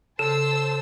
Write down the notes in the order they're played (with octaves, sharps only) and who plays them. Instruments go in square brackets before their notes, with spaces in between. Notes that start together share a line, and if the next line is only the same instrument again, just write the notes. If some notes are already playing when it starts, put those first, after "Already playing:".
[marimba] C#3 [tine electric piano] A4 [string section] C5 A5 E6 [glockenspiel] E7